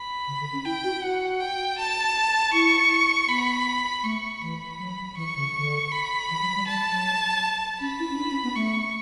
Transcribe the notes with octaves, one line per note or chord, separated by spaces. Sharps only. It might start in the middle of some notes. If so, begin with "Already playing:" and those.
Already playing: B5
C#3
D3
C#4
E4 G5
F#4
F#4 F#5
G5
A5
E4 C#6
B3 B5
A3 C#6
E3 B5
F#3
E3 C#6
C#3
D3
B5
E3
F#3
G3
G3 A5
F#3
C#4 B5
E4
C#4
D4
C#4
B3
A3 C#6